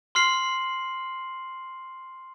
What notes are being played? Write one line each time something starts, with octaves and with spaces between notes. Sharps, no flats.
C6 F6 C7 F#7